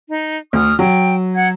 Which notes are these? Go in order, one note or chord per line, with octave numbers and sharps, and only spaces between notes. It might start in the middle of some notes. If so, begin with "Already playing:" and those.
D#4
D2 C#6 D#6 F6
F#3 G5
F#5 G#6